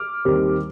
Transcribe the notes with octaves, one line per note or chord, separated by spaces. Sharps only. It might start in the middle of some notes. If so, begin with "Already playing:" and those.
Already playing: D6 F6
D#2 D#3 G3 C4